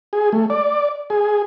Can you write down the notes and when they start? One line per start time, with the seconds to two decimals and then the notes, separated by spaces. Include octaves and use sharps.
0.13 G#4
0.32 A3
0.50 D5
1.10 G#4